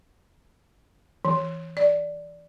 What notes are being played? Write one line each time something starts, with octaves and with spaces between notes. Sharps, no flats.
E3
D5